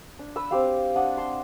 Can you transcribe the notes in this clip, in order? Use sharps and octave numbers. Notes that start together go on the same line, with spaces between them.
D4
B4 E6
C4 G4 F5
D4 F#5 D#6
A5 C6